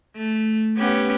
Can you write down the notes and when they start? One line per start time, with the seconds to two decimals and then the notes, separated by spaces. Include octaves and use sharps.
0.17 A3
0.77 B3 C#4 G4